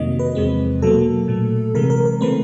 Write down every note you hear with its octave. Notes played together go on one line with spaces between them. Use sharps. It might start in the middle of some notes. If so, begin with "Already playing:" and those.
Already playing: F2 C3 D#3 F#3 A#3 D#5
B4
E2 C3 F3 G#3 C4
B2 F#3 A#3 A4
A#2 F#3 A3
C3 E3 G#3 A#4
A#4
A#4
C#3 E3 A3 C4 B4